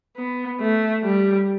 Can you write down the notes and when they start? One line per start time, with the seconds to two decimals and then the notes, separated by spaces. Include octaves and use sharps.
0.17 B3
0.60 A3
1.03 G3